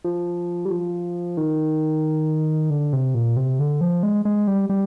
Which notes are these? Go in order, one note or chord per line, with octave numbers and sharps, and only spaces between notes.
F3
G3
F3
D#3
D3
C3
A#2
C3
D3
F3
G#3
G#3
G3
G3